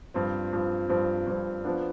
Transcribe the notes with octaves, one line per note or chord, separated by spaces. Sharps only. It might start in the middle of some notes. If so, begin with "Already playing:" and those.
G2 F3 C4
G2 F3 C4
G2 F3 C4
G2 F3 C4
F3 B3 D4